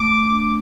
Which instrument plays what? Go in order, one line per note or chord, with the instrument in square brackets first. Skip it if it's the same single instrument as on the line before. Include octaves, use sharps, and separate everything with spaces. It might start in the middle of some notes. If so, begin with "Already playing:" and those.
Already playing: [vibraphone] A3 [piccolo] D6
[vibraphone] D4